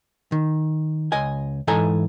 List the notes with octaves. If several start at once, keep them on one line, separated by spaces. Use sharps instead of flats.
D#3
C#2 D#5 G#5
G#2 E3 A4 D#5 G#5 A#5